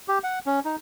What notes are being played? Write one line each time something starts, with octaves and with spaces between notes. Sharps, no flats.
G4
F#5
C#4
D#4